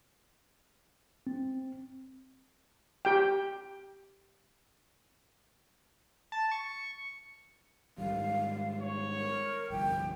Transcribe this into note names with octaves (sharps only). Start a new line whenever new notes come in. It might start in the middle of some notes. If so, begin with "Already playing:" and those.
C4
G4 G5
A5
C#6
G#2 D#3 G3 F5
C#5
A#4
G1 C2 F3 G5